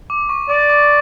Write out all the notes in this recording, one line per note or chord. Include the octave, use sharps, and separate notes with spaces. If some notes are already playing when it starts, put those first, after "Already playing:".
D6
C#6
D5 D6
D6